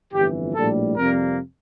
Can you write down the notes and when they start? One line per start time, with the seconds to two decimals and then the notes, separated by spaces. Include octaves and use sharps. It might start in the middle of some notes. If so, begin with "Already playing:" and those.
0.13 G1 F2 E3 G4
0.55 A#1 A2 G3 A4
0.96 F2 C3 G3 A#3 A#4